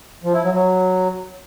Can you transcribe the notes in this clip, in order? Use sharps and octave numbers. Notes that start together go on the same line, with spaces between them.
F3
E4
F#3
F#3